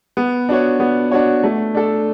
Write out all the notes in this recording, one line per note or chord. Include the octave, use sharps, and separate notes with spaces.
B3
D4 F#4 C#5
B3
D4 F#4 C#5
A3
D4 A4